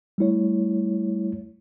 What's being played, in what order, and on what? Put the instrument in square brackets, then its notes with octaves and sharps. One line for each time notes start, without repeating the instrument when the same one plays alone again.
[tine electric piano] G3 A3 E4 C#5